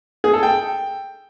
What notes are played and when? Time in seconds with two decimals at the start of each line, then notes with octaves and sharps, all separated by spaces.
0.24 G#4
0.33 A4
0.43 G5